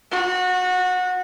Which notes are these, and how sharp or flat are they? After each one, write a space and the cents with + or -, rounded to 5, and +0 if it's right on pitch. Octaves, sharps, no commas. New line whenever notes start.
F#4 -20